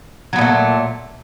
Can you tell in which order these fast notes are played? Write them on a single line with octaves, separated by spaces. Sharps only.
F#3 B3 A#2 A3